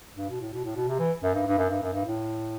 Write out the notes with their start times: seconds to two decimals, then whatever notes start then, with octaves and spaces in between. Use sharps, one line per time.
0.18 G2
0.30 B2
0.41 A2
0.53 B2
0.64 A2
0.76 B2
0.88 C3
0.99 E3
1.23 F#2
1.34 G2
1.47 G2
1.58 F#2
1.70 G2
1.82 F#2
1.93 G2
2.05 A2